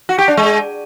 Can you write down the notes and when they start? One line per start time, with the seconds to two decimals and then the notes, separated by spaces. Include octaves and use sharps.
0.09 F#4
0.18 G4
0.28 D4
0.37 G#3